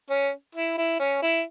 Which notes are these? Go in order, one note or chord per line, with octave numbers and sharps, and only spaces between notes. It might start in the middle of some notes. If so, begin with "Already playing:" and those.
C#4
E4
E4
C#4
E4